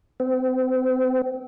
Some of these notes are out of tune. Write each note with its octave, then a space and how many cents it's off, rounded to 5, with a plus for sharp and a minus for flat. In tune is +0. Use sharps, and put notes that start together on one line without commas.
C4 -30